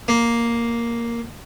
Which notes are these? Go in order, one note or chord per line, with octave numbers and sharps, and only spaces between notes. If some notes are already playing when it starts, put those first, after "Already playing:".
A#3